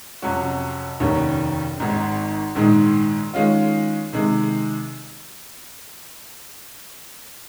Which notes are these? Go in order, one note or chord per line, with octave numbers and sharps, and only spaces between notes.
F2 C3 F#3 C#4 F#4
F1 D#2 D#3 F#3 C#4
G#1 G#2 D#3
A#1 G#2 D#3 G#3 D#4
D#3 G#3 C#4 F4
C3 D#3 G#3